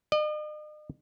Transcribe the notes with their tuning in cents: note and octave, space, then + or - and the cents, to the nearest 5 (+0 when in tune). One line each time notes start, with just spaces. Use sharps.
D#5 -45